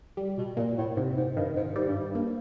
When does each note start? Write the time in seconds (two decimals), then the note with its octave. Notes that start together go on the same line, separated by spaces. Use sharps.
0.17 G3
0.38 B2
0.57 A#2 A#3
0.78 A2
0.96 G#2 C3
1.17 G#2
1.36 G2 D#3
1.56 G#2
1.76 G#2 G3
1.87 G2
2.09 G2
2.15 A#3